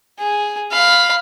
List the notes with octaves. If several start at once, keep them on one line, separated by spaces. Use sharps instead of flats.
G#4
F5 B5